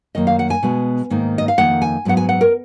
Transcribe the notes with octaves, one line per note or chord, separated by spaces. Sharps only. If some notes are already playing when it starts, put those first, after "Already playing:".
F#2 D#3 A#3 D#5
F5
F#5
G#5
B2 G#3 B3
G#2 D#3 A#3
D#5
F5
F2 D#3 A#3 F#5
G#5
G#2 F#3 B3 F#5
G#5
F#5
A#4